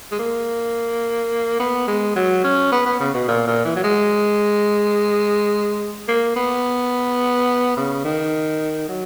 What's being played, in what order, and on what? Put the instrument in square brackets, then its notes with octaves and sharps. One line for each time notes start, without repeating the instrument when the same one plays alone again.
[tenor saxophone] G#3
A#3
B3
G#3
F#3
C#4
B3
B3
C#3
B2
A#2
A#2
E3
F#3
G#3
A#3
B3
C#3
D#3
F#3